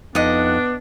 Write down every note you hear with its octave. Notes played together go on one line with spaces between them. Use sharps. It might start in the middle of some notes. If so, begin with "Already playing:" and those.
F2 B3 D4 D#4 D#5 F#5